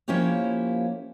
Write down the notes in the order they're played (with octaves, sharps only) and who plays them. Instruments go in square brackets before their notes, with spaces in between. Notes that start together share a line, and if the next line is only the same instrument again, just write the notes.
[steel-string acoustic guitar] F3 A#3 C#4 E4 G4 C#5